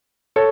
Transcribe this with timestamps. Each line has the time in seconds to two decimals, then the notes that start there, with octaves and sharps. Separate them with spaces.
0.36 A4 C#5